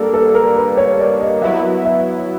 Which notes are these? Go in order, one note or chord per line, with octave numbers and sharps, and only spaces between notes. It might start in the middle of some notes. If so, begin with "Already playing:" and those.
Already playing: G3 A#3 D4 A4 A#4
A4
A#4
B4
C#5
D5
D#5
F#3 B3 E4 E5
E5